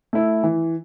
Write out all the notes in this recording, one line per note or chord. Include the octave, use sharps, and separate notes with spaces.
A3 E4
E3